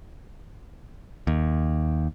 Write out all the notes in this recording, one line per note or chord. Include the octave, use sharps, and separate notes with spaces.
D#2